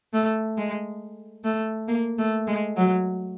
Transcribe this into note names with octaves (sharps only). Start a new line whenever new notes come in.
A3
G#3
A3
A#3
A3
G#3
F#3